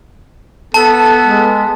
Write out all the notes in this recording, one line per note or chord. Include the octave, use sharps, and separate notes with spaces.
B3 A4 A5
G#3